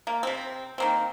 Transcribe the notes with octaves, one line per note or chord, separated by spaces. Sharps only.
A#3
C3 C4
D#3 A#3 C4